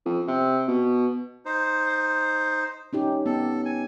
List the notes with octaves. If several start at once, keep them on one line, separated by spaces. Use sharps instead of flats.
F2
C3
B2
D#4 C5
C#4 D#4 G4
B3 A4
G#5